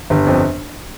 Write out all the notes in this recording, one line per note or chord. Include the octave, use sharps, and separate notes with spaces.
G1
F2